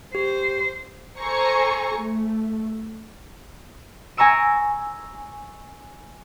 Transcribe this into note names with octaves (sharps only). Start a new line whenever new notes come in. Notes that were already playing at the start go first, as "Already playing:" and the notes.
G4 C5
A4 C5 G#5 A#5 C#6
A3
G#5 A#5 C#6 E6 D7